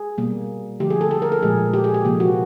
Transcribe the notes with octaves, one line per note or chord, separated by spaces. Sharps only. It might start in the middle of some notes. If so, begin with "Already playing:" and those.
Already playing: G#4
B2 G3 A#3
D3 F3 A3 G4
G#4
A4
A4
A#4
A4
A#2 F3 G#3 G#4
G4
G#4
G4
C3 F3 A#3
F#4